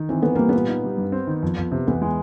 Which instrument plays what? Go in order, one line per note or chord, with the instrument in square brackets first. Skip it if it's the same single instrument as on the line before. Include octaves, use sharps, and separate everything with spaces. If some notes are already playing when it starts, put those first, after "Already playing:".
Already playing: [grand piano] D#3
[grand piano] E3 [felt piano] C4
[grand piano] E3 [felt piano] B3
[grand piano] G3 [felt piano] A#3
[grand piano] A#2 [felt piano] B3
[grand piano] D#4
G3
G2
C4
D#3
F2
F2
C3
[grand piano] E2 [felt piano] B3
[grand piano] G#3